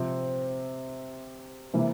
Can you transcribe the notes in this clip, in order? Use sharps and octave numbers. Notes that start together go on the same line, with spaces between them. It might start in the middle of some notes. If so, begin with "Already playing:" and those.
Already playing: C3 F3 C4
C3 E3 A#3 E4